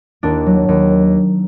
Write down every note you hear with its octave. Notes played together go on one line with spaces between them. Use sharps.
D#2 D4
F#3
D#2